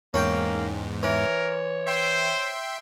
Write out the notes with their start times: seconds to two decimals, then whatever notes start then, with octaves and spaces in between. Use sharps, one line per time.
0.14 E2 G#2 A#3 C#4 G5
1.03 E3 A#4 C#5
1.87 C5 E5 G5 C6